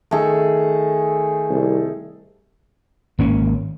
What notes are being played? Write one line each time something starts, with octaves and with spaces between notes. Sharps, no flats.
D#3 A3 G#4 A4
C2
G#1 A#3 C#4